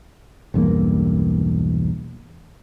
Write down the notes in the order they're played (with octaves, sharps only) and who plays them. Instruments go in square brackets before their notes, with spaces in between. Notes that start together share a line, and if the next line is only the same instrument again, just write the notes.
[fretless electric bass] B1 E2 G2 A#3